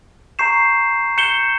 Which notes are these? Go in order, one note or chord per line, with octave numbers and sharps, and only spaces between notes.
A#5 C#6 G6 C7 E7
G6 C#7 E7 G7